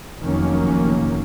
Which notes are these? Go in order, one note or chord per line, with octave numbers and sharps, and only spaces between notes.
F1 D#3 F#3 A#3 C#4